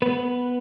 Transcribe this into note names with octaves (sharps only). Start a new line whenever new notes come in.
B3 B4